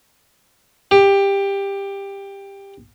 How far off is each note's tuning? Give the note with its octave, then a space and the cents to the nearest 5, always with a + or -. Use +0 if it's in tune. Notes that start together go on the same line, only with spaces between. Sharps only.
G4 +15